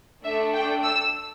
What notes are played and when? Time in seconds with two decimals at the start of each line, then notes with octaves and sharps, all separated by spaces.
0.23 A3 D4 A4 E5
0.54 G5
0.83 E6